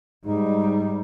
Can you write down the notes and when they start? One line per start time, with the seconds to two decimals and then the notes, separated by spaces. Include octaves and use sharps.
0.24 G#2 G3 D#4